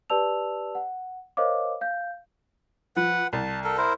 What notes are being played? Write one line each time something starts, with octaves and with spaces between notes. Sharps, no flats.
G4 B4 D5 A5 E6 F7
F#5
A#4 C5 C#5 D#5 F5 D6
F5 G6
F3 B4 F#5
C2 A5
A4 A#4
E4 A#4 C5